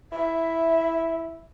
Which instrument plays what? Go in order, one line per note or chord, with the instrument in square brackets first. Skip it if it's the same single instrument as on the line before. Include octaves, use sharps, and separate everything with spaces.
[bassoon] E4 [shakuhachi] E5